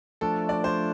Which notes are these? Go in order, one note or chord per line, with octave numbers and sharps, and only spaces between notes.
F3 A3 D4 A4
D5
C5